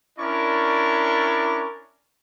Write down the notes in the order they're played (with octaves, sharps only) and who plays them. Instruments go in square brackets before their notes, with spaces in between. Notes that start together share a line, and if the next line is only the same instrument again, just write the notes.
[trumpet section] C#4 D4 E4 A#4 D5 C#6